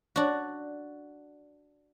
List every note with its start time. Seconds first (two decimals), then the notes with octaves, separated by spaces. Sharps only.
0.16 D4 F#4